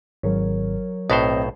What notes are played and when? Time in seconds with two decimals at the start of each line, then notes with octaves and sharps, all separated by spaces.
0.23 G#1 F#3 A#4 C#5
1.10 B1 A2 C4 C5 D#5